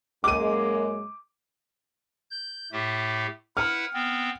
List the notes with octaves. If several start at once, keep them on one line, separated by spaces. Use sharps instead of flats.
F#2 G#3 A#3 D6 D#7
G6
A2 A3 G4
E4 B4 F#5 F6
B3 C4